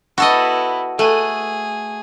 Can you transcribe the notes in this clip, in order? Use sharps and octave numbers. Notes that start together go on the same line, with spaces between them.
B3 E4 F#4 A4 D#5
A3 G#4 A4 F#6 D#7